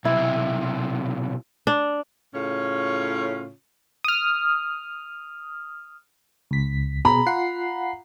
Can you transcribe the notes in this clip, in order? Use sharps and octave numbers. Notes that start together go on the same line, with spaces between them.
B1 C3 E4
D4
A2 C#3 C#4 F4 C#5
D#6 F6
C#2 B6
B2 G#4 A#5 B5
F4 F#5 C7